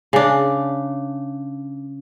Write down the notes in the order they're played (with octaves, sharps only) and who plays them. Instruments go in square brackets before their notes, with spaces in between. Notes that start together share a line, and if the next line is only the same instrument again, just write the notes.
[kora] C#3 D4